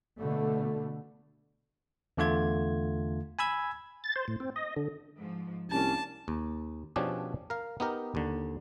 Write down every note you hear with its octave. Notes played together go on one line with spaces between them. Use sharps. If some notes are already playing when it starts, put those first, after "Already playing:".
B2 D3 A3
E2 D3 A3 F4 G#6
G#5 B5 E6 G#6
A6
C5
A2
C4
D#5
D3
G#2 F3
C2 A#3 C#4 D4 A5
D#2
B2 F3 C#4 D4 G4 G#4
A#4 F5
B3 D#4 G4 A#4
D#2 D3